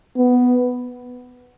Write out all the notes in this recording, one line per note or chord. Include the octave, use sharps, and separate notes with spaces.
B3